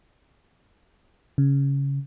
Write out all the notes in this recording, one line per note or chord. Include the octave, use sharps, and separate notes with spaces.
C#3